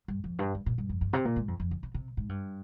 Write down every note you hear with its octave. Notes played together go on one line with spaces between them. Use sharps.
G2
F2
G2
G2
A#2
G2
F2
G2
C3
A#2
G#2
F2
F2
C#3
C3
C3
G#2
G2